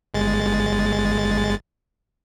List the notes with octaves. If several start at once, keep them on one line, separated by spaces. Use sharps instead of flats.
G1 G#3 A6